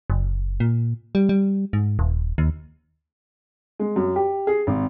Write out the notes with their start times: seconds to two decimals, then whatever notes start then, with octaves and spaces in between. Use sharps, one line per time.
0.10 F#1
0.60 A#2
1.15 G3
1.29 G3
1.73 G#2
1.99 D#1
2.38 D#2
3.79 G#3
3.96 F#2
4.16 G4
4.47 G#4
4.67 G#1